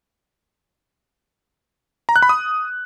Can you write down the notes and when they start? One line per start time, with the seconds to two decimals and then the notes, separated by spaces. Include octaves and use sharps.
2.09 A#5
2.16 F#6
2.22 B5
2.29 D#6